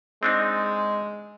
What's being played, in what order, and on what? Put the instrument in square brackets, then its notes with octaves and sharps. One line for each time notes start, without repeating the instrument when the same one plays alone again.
[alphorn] G#3 [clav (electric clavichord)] C4 D4 D#4